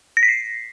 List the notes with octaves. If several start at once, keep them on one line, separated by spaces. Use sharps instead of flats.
A#6
B6
C7